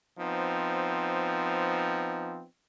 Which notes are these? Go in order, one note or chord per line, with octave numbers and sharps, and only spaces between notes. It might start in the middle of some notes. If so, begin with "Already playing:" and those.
F3 B3 C4 D#4